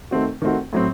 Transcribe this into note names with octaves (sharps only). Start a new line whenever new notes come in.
D#3 A3 C4 F#4
D#3 A3 C4 F#4
A2 F#3 C4